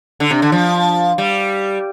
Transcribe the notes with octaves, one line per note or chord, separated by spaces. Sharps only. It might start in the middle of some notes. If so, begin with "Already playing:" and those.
D3
C3
D3
F3
G3